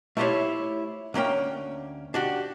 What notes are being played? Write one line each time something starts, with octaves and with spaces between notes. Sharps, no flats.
A3 E4 F4 G4 C5 C#5
D2 A#3 C#4 G5
D4 F#4 G4